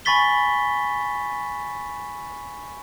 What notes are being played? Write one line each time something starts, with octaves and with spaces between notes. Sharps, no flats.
G#5 B5 C#6 A6 B6 G7